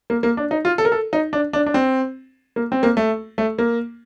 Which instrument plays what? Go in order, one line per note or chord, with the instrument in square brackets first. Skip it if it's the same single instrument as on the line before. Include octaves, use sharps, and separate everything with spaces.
[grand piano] A#3
A#3
D4
D#4
F4
A4
A#4
A4
D#4
D4
D4
D4
C4
A#3
C4
A#3
A3
A3
A#3